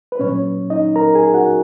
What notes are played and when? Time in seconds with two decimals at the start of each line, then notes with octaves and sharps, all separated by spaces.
0.12 B4
0.19 A#2 F#3 C#4 C#5
0.70 D#4 D#5
0.96 A#4 A#5
1.15 G#4 G#5
1.34 F#4 F#5